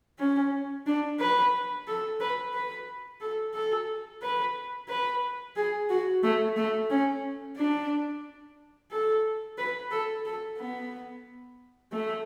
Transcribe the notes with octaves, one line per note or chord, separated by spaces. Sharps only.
C#4
D4
B4
A4
B4
B4
A4
A4
B4
B4
G#4
F#4
A3
A3
C#4
D4
A4
B4
A4
A4
B3
A3